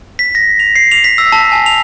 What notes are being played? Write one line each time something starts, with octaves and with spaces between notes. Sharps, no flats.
B6
A#6
F7
C7
F7
B6
E6
A5
G#5
F7